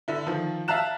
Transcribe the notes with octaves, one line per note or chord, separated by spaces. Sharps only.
D3 E4
D#3 F3
E5 F5 A5 A#5 F#6 E7